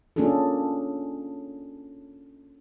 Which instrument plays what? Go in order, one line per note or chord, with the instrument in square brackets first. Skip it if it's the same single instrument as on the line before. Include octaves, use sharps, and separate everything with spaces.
[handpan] A#3 C#4 D4 F4 G#4 A4